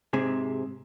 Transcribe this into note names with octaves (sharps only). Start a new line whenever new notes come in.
G#2 C3 G#4